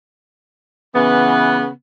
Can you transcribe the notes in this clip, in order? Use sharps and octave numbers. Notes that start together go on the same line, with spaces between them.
C#3 E3 B3